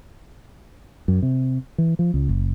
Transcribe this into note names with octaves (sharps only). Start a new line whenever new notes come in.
F#2
C3
E3
F3
C#2
F#1